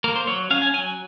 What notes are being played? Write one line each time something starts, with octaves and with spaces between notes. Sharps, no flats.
A#3 A#4
C5
F#3 C#5
C#4 F5
G#5
F#3 G#5